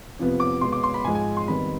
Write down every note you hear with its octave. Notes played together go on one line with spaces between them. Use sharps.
F2 C3 F3 B3
D6
B2 G#3 B3 C6
D6
C6
B5
G#2 F3 G#3 G#5
G#5
C6
F2 D#3 G3 B3 B5